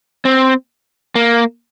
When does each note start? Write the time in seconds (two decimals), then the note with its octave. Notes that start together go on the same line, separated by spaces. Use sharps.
0.25 C4
1.15 A#3